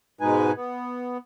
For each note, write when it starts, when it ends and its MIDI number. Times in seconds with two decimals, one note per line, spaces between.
0.21 0.52 44
0.21 0.52 47
0.21 0.52 56
0.21 0.52 63
0.21 0.52 71
0.21 0.52 80
0.55 1.17 59